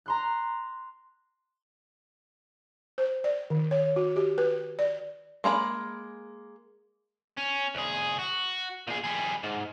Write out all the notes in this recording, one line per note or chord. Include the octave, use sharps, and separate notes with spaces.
A#5 C6 F#6
C5
D5
D#3
C#5
F#4
G4
B4
D5
G#3 A#3 A#5 B5
C#4
C2 G#4
F#4
A#2 G#4
G3 G#4
G#2